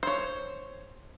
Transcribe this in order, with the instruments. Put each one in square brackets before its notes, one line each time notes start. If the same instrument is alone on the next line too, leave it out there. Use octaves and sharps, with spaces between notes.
[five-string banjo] C5 C#5